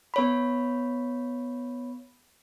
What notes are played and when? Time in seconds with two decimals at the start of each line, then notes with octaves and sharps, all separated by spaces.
0.14 B3 C#5 B5